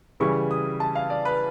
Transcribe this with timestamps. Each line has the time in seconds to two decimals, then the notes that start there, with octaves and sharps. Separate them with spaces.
0.20 C#3 E3 G3 C#6
0.51 D#6
0.80 A5
0.95 F5
1.10 D5
1.25 B4